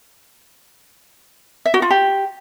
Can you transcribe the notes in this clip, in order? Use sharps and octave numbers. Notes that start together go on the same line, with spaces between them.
E5
F#4
F4
G4